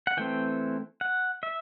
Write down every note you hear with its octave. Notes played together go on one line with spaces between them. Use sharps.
F#5
E3 A3 C4 G5
F#5
E5